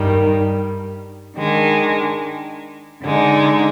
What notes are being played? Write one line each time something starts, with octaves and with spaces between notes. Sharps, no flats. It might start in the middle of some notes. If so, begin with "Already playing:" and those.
Already playing: G2 D#3 G3
D#3 G#3 D4
D3 G#3 D#4